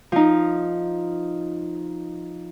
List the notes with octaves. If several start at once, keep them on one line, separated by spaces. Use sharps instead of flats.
F3 D#4